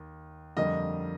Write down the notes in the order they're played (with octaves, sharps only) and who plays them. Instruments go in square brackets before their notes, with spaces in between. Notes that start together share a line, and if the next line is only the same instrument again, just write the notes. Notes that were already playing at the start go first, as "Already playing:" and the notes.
Already playing: [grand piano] D#2
F2 D3 G3 A#3 D#5